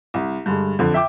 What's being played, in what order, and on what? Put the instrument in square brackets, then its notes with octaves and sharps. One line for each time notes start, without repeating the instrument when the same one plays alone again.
[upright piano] C2
G2 D3 G#3
F2 D3
E5 G5 D6